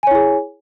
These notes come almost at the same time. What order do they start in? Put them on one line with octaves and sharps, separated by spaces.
G#5 C#5 E4 G#4